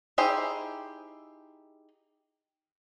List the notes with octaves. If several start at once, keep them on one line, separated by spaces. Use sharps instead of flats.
D#4 E4 G4 G#4 C5